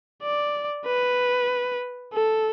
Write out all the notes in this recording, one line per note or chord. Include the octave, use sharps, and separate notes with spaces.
D5
B4
A4